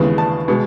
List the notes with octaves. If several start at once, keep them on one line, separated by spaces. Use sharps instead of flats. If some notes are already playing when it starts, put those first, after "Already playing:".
Already playing: D#2 C#3 E3 G#3 B3
A5
B2 G#3